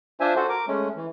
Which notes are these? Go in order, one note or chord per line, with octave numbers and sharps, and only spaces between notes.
D4 F4 C5 E5 G#5
F#4 A4 C5
A#4 D6
G#3 A3 C#4
E3